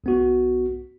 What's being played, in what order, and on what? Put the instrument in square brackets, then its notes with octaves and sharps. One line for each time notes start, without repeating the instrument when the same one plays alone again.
[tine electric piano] B1 B3 F#4